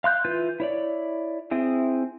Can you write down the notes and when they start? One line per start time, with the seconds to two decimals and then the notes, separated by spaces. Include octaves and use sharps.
0.04 F5 C6 F#6 G6
0.25 E3 F4 B4 G6
0.60 E4 C#5 D5
1.51 C4 E4 G#4